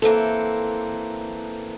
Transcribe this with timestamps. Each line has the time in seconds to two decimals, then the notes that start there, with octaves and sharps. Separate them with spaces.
0.02 E3 A#3 C4 A4